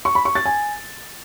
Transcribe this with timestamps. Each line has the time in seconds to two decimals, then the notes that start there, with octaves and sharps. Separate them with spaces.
0.05 C#6
0.15 B5
0.25 C#6
0.35 A6
0.46 G#5